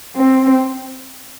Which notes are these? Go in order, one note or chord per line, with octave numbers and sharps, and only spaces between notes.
C4